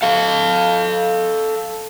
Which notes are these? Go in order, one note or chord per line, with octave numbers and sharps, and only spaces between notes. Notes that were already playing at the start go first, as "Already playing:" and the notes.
A4 F5